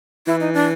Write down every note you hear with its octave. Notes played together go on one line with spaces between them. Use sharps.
E3 E4
D#4
D4